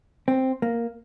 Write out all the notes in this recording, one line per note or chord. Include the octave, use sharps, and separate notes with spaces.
C4
A#3